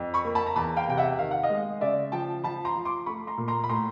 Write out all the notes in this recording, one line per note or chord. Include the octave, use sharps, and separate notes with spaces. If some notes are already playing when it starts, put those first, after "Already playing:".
Already playing: F2
B5 C#6
A#3
A5 B5
A#5
E2 A5 B5
F5 G5
C3 G5
E5 F#5
D#3 F5
F#5
D#5 F5
G#3
C#3 D5 E5
F3 G5 A5
F3 A5 B5
A#5 C6
F3
C6 D6
A3 B5 C#6
A#5 C6
A#2
A#5 C6
B5
A2 A#5 C6